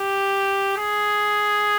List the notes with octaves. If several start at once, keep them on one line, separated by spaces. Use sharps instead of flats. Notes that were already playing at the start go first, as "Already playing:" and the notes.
Already playing: G4
G#4